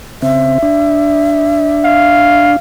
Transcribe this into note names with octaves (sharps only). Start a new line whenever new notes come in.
C#3 C4 E5
D4
F5